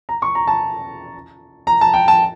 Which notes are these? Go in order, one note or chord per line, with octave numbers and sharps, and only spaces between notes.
A#5
C#6
A#5
A5
A#5
A5
G5
A5